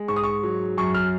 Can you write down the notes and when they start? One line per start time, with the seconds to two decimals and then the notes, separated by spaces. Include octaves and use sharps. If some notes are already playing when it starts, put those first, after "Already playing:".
Already playing: G#3
0.08 G#2 C#6
0.16 D#6
0.23 C#6
0.43 F#3
0.78 F#2 C#6
0.94 F6